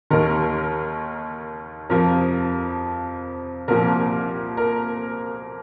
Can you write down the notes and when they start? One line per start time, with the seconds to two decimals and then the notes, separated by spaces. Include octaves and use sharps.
0.10 D#2 D#3 A#4
1.90 F2 C3 F3 A#4
3.68 C2 A#2 F3 A#4
4.57 A#4